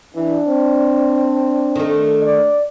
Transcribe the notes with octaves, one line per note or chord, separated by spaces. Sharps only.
E3 D4
C4
D#3 A3
D5